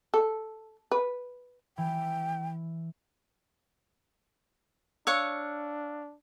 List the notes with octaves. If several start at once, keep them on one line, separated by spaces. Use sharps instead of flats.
A4
B4
E3 G5
D4 C#5 F5 C#6 E6 F#6